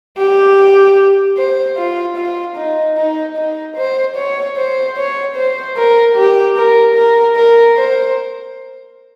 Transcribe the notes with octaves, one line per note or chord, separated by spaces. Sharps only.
G4
C5
F4
F4
D#4
D#4
D#4
C5
C#5
C5
C#5
C5
A#4
G4
A#4
A#4
A#4
C5